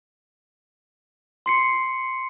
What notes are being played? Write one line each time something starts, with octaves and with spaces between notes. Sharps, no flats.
C6 C7 C#7